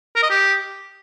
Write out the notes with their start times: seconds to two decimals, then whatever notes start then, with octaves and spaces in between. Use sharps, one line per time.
0.16 A#4
0.23 D#5
0.30 G4